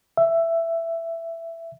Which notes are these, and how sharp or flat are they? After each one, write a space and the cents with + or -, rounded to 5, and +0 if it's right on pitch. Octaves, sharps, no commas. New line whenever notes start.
E5 +10